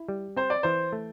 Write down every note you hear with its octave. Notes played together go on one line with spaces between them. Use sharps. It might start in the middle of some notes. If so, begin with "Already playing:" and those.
Already playing: E4
G3
C4 C5
D5
E3 C5
A3